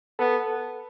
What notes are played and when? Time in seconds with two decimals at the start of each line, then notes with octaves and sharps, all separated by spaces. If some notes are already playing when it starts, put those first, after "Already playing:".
0.19 B3 A4